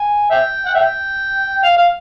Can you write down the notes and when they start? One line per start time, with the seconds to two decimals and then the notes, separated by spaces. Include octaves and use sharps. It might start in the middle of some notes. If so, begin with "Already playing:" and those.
Already playing: G#5
0.31 E5 G5
0.66 F#5
0.75 E5 G5
1.64 F5
1.77 F5